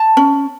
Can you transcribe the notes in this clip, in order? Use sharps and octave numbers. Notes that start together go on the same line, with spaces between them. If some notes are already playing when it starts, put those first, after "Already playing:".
Already playing: A5
C#4